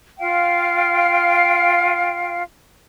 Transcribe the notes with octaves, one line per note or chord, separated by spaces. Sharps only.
F4 F5 G5